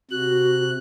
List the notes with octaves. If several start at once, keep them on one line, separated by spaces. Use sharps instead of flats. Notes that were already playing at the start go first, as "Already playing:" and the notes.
C3 F#4 F#6